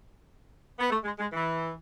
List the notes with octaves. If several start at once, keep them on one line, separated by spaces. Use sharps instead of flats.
B3
A3
G#3
G#3
E3